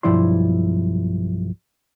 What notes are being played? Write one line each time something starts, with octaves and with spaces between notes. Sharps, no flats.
B1 G2 F3 E4 D5 C6